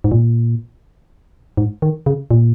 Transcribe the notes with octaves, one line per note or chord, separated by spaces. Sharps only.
G#2
A#2
G#2
D#3
C#3
A#2